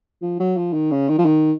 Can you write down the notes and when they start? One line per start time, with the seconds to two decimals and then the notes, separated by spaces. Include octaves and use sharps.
0.22 F3
0.40 F#3
0.57 F3
0.73 D#3
0.91 C#3
1.09 D#3
1.18 F3
1.25 D#3